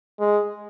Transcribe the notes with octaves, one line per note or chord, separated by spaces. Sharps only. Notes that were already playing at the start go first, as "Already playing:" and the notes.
G#3